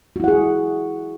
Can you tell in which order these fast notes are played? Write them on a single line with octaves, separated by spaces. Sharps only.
F#4 E4 F#5 G#4